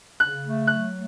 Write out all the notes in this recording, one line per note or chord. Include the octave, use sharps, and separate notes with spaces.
C#3 F#6
A3
F#3 F#6
A3